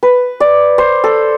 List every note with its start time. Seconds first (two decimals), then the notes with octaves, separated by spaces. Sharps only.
0.03 B4
0.40 D5
0.78 C5
1.04 A4